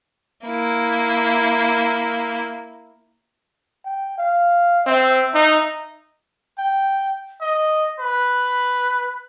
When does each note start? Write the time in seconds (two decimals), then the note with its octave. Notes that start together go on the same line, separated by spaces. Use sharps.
0.46 A#3 E4
3.85 G5
4.18 F5
4.86 C4 E5
5.34 D#4
6.58 G5
7.41 D#5
7.99 B4